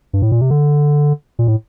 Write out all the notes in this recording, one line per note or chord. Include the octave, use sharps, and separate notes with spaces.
G2
A2
A#2
C3
D3
A#2
A2